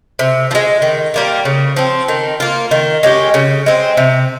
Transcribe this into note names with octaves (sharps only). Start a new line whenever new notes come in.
C3
F3
G#3
D#3
G3 A#3 F4
C#3
F3 C4
D#3
A#3 F4
D#3
G#3 C#4 G4
C#3
G#3 C4
C3